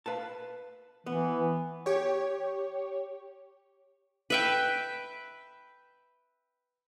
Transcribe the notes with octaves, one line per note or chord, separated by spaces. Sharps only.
B4 F5 A5
E3 B3
G4 C#5
B4 E5 G5